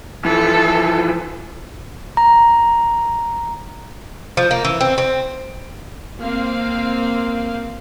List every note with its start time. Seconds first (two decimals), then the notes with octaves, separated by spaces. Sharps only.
0.25 E3 F3 A4
2.17 A#5
4.37 F3
4.51 A#3
4.65 E3
4.81 C4
4.98 C4
6.20 A#3 C4 F5